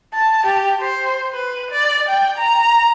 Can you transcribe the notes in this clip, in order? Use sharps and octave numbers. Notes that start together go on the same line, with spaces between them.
A5
G4
C5
B4
D5
G5
A#5